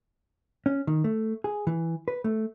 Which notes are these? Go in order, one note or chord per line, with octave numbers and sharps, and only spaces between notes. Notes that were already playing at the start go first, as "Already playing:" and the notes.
C#4
D#3
A3
G#4
E3
B4
A3